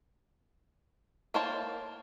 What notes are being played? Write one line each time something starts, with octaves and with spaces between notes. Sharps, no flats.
A#3 E4 C5 C#5 A5